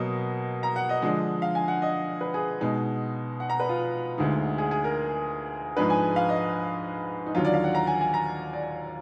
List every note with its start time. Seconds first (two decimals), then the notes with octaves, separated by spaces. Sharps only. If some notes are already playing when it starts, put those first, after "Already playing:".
Already playing: B2 F#3 A#3 D#5
0.63 A#5
0.76 F#5
0.89 D#5
1.02 D3 F3 G#3 D4
1.42 F5
1.55 G#5
1.68 F#5
1.82 D#5
2.21 B4
2.34 G#4
2.61 B2 G#3 D#4
3.40 F#5
3.50 A#5
3.60 B4
3.69 F4
4.18 D2 D3 G#3 D#4
4.58 G#4
4.71 G#4
4.84 A#4
5.77 G#2 F3 G#3 D4 B4
5.90 G#5
6.16 F5
6.29 D#5
7.26 D#4
7.35 D#2 D3 F#3 F4
7.45 D5
7.54 F5
7.64 F#5
7.75 A#5
7.87 G#5
8.01 G#5
8.14 A#5
8.53 D5